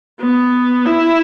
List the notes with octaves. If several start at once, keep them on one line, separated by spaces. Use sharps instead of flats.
B3
E4